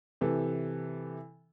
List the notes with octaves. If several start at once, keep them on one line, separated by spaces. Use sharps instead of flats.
C3 E3 A4